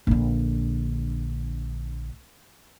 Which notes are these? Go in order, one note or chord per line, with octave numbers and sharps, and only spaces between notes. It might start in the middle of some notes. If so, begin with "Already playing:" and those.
A#1 D3